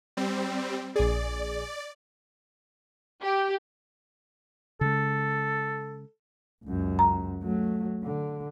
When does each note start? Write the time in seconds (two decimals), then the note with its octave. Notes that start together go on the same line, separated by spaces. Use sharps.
0.17 G3 C4
0.96 A#1 G#4 D5
3.22 G4
4.81 C#3 G#3 A4
6.64 C#2 F#2
6.99 A#5
7.42 F#3 A3
8.04 D3